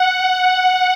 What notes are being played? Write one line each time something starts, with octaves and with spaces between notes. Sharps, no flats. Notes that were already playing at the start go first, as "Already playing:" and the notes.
Already playing: F#5
F#5